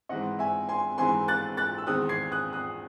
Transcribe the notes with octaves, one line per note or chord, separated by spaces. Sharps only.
G#2 E3 C4 D#5 F#5
E5 G#5
G#5 C6
G#2 E3 C4 G#5 C6
F#6 A6
F#6 A6
E6
E2 D#3 G#3 C4 D#6 F#6
G#6 C7
D#6 F#6
D#6 F#6